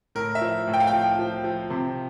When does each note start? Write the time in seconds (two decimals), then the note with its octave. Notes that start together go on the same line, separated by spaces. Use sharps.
0.15 A2 A#4
0.35 E5
0.41 F3
0.68 A2
0.74 G5
0.80 F5
0.87 G5
0.93 F3
1.19 F3
1.44 F3
1.70 C3